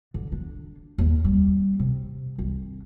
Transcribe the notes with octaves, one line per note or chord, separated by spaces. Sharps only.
D3
D4
D#2
G3
C3
C2